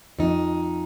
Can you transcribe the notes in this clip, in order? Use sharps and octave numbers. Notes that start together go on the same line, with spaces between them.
F2 D#4